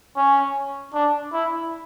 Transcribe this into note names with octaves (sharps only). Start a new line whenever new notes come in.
C#4
D4
E4